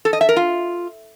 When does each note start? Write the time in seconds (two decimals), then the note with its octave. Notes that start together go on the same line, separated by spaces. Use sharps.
0.05 A4
0.13 D#5
0.21 E5
0.29 A#4
0.36 F4